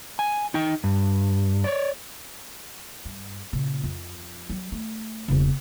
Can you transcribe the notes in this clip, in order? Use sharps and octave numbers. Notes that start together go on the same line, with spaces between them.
G#5
D#4 G5
G2
C#5 D5
G2
A#2 C#3
F2
F#3
A3
E1 C#3